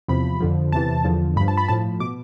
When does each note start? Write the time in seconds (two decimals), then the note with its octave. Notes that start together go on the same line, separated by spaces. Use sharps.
0.08 E2 C3 F3 B5
0.40 F2 D3 F3
0.72 E2 C3 E3 A5
1.04 E2 D3 F3
1.36 G2 B5
1.41 F3
1.48 A5
1.57 B5
1.68 A2 F3 A5
2.00 B2 D6